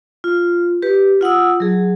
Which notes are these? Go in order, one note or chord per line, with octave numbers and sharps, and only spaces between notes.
F4
G4 B4
F4 F#5 D#6 E6
F#3 G#4